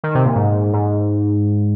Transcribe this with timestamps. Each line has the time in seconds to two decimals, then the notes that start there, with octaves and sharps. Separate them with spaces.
0.04 D#3
0.15 C3
0.25 A#2
0.36 G#2
0.74 G#2